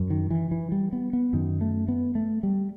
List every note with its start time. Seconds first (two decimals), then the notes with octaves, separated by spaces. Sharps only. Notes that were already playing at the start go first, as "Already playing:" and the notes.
Already playing: F#2
0.10 D#3
0.31 E3
0.51 E3
0.72 G3
0.93 B3
1.13 B3
1.33 F#2 D#3
1.61 A3
1.88 B3
2.15 A3
2.43 G3